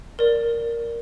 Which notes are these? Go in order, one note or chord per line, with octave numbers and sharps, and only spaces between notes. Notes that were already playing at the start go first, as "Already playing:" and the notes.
A#4 D5